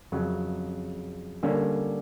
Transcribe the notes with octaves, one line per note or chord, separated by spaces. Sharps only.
F2 C#3 F#3
D3 G3 A#3 C#4